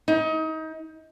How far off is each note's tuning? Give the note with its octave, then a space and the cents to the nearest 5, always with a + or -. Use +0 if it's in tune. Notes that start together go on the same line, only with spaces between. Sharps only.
D#4 +30